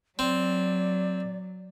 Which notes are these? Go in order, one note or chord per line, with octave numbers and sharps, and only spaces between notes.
F#3 C4 D5